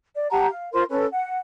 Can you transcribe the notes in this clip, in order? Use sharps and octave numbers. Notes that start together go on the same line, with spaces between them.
D5
G4 F#5 A5 A#5
F5
F4 A#4 C5 C6
C#4 A4 B4
F#5